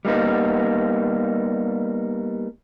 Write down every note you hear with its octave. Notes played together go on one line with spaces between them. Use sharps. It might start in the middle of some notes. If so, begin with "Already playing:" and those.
G3 A#3 B3 D#4